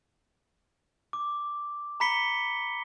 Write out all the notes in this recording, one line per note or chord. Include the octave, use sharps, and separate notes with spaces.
D6
A#5 B5 B6 C#7 G7